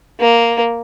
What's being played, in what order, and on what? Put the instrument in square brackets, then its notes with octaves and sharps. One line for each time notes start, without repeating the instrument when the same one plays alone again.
[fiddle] A#3